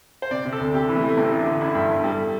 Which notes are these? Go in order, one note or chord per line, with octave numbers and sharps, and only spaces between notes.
C5
C3 D5
C3
A4
D2
C3 G4
E3
A3
E3
A3
A1 C4
A1
D4
D3
A1 E4
G2
G2
G3 A4